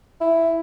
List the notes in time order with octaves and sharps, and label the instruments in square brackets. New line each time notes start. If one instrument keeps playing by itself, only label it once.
[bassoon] E4